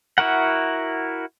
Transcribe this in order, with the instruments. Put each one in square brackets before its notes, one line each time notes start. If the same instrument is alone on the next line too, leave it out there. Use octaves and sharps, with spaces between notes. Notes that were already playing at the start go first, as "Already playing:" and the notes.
[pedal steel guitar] E4 F#4 A#4 F#5